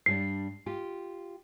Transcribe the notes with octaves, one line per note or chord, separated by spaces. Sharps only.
G2 G3 D4 C7
F4 G4